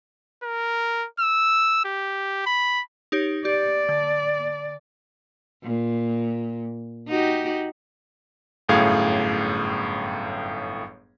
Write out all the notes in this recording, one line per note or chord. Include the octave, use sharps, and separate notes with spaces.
A#4
E6
G4
B5
D#4 G4 C#5
G4 D5
D3
A#2
D#4 F#4 G4
G1 F#2 A2 G#4 F5 G#6